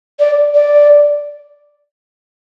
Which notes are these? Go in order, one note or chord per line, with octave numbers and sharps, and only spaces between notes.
D5
D5